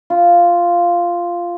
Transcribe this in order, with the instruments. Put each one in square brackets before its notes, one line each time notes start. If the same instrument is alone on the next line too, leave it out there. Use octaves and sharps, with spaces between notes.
[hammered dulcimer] F4